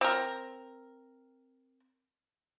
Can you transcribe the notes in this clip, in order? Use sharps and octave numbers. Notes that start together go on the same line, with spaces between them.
C4 A#4